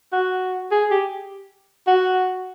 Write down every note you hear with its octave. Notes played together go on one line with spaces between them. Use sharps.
F#4
G#4
G4
F#4